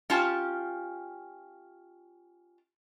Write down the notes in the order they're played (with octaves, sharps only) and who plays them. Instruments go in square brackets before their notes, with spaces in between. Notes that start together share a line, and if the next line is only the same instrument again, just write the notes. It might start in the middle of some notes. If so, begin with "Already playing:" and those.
[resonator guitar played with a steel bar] C#4 F4 G4 A5